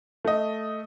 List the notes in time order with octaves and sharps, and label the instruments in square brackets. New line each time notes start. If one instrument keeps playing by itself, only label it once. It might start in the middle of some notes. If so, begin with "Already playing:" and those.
[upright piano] A3 D#5